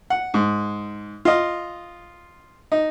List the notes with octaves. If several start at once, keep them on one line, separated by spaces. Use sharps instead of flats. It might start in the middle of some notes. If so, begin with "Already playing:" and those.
F#5
G#2
F4 D#5
D#4